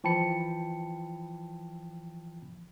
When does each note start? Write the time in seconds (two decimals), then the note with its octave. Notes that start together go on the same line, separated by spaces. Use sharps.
0.04 E3 F3 G5 A5 B5 C#7